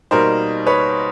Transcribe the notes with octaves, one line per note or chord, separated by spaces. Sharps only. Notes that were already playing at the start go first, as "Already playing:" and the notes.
B2 G3 A#3 D#4 A#4 C5
B4 C#5